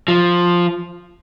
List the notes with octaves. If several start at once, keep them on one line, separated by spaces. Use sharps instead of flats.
F3